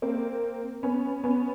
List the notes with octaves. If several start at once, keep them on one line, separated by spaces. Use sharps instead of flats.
A#3 C4
B3 C#4
B3 C#4